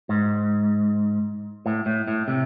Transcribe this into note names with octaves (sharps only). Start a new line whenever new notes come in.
G#2
A2
A2
A2
C3